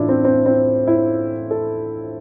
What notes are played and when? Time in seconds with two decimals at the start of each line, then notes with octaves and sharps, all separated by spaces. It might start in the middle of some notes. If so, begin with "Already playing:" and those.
Already playing: A2 E3 D4 E4 F4
0.09 C4
0.25 C4
0.46 C4
0.87 E4
1.51 A4